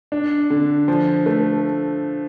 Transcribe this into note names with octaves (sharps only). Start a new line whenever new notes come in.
D4
D3
F3
A3